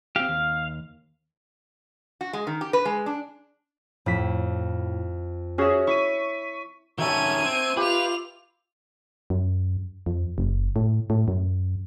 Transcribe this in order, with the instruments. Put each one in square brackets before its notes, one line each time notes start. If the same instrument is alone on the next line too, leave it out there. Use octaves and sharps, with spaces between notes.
[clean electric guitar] C4 G4 [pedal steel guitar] F5
[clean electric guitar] D#2
[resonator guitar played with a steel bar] F#4
G#3
D#3
G4
B4
G#3
D4
[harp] F2 B6 [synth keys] A2
[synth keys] C#4 F#4 G#4 [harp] C#5 E5
[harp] E4 [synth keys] C#6 B6 D#7
[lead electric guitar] D#3 C#4 [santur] F#4 E5 A5 [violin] G#6 D#7
[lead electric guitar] C4
[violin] F4 F7 [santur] G4 [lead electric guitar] B4
[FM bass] F#2
F2
F#1
A2
A2
F#2